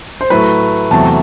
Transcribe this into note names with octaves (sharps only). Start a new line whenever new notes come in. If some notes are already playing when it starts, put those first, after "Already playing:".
C5
A2 F#3 A3 B4
E2 C3 F#3 A3 A5